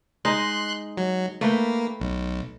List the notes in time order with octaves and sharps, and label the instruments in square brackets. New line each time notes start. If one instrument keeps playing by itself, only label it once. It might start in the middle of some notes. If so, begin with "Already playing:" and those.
[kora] G#3 D#4 [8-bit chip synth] C6 F#6
[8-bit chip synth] F#3
[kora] A3 B4 G5 [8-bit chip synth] A#3
[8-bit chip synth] B1